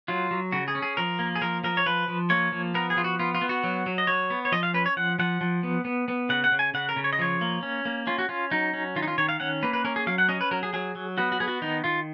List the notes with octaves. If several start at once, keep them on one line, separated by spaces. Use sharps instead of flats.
F#3 F4
F#3
C#3 F#4
G#4
C#4
G#4
F3 A#4
A#3
G#4
F3 A#4
F3 A#4
C#5
F3 B4
F3
A#3 C#5
F3
B3 A#4
G#4
F3 F4
F#4
B3 F4
F4
B3
F#4
F#3
F#3
D#5
F#3 C#5
B3
C#5
F3 D#5
F5
C#4 B4
C#5
F3 F#5
F3 F#5
F3
B3
B3
B3
C#3 F#5
F#5
C#3
G#5
C#3 F#5
A#4
C#3
C#5
D#5
F3 C#5
A#3
C#4
A#3
C#4 F4
F#4
C#4 F4
F#3 D#4
C#4
D#3 F4
D#4
F4
D#3 C#5
F5
C#4 F#5
A#3 B4
B4
C#4 A#4
G#4
F#3 F5
F#5
C#4 D#5
B4
F#3 A#4
G#4
F#3 G#4
F#3
B3 F#4
F#4
B3 G#4
F#4
D#3 D#4
D#3 F4